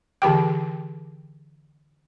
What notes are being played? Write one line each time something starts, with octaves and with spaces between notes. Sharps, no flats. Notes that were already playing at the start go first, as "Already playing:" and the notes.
D3 E3 G4 G5